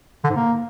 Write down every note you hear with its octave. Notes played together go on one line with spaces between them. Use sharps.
D3
G#2
A#3